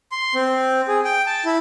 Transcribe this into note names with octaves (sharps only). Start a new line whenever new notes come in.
C6
C4
G#4
G5
A5
E4